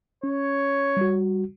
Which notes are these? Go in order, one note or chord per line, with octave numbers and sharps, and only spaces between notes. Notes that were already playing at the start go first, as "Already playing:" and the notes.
C#4 C#5
G3 F#4